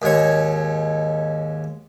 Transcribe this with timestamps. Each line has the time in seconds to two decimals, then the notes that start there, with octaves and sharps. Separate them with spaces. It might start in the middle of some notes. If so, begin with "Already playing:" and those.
0.02 D#2 G#2 C#5